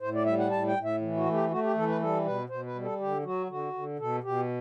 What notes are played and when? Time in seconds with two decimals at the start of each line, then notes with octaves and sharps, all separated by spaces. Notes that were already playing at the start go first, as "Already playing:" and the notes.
0.01 A2 C5
0.14 D5
0.26 G3 E5
0.39 F#5
0.51 A2 A5
0.67 G5
0.76 A2
0.84 E5
1.01 E3
1.17 F#4
1.26 A3
1.33 G4
1.50 A3 F#4
1.63 G4
1.75 E3 A4
1.88 B4
2.01 G3 A4
2.25 B2 B4
2.49 B2 C5
2.66 B4
2.75 G3
2.83 A4
3.00 D3 G4
3.24 F#3 F#4
3.49 D3 F#4
3.73 D3
3.99 B2 A4
4.23 B2 G4